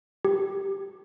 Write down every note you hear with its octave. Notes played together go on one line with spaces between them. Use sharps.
G4